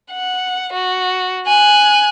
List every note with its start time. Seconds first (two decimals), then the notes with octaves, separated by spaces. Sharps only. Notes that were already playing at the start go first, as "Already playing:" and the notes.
0.12 F#5
0.73 F#4
1.47 G#5 F#6